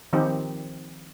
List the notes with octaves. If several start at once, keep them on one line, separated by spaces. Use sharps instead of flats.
D#3 F3 C4 D#4 G4